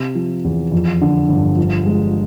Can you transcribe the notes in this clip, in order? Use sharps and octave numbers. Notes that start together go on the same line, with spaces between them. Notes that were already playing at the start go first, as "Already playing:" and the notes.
Already playing: C3
F3
E2
F2
D3
G1
F3
G#3